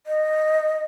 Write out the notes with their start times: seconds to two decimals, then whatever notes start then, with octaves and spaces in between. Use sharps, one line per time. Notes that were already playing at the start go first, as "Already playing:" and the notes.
0.07 D#5